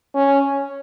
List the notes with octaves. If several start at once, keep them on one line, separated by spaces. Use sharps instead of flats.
C#4